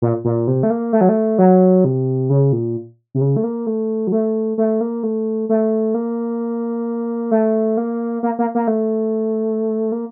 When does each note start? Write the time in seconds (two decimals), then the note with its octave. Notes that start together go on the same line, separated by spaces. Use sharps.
0.02 A#2
0.25 A#2
0.48 C3
0.63 A3
0.70 A#3
0.93 A3
1.01 F#3
1.09 A3
1.39 F#3
1.84 C3
2.29 C#3
2.52 A#2
3.15 C3
3.21 C#3
3.36 A3
3.44 A#3
3.67 A3
4.07 F#3
4.12 A3
4.58 A3
4.81 A#3
5.03 A3
5.49 A3
5.94 A#3
7.31 A3
7.77 A#3
8.23 A#3
8.39 A#3
8.55 A#3
8.68 A3
9.92 A#3